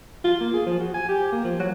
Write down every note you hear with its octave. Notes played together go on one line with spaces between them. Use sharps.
F4
A#3
G#4
F3
F#4
G#5
G4
A#3
F3
F#3